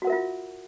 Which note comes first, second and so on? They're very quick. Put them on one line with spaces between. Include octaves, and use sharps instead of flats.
F#4 F#5 A#4 E5 F4